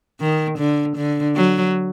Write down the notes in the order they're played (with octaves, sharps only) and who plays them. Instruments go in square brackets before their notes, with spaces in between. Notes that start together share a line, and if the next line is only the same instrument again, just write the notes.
[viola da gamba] D#3
D3
D3
F#3